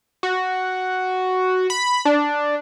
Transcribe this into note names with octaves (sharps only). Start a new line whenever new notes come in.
F#4
B5
D4